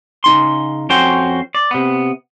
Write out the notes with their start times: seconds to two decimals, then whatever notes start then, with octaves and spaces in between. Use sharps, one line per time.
0.24 C#3 D#4 C6
0.90 F2 C#4 F#4 C5 G5
1.55 D5
1.71 C3 B3